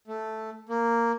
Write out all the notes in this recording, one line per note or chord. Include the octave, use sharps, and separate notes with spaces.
A3
A#3